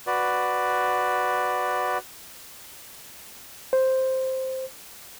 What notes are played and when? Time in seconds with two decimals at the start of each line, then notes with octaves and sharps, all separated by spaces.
0.07 F#4 B4 D5
3.73 C5